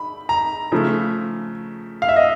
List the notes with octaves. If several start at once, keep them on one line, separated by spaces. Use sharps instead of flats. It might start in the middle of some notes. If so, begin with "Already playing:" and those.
Already playing: B5
A#5
C#3 F3 A3
F5
E5
D#5